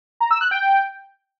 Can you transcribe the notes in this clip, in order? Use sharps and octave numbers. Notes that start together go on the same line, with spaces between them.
A#5
E6
F#6
G5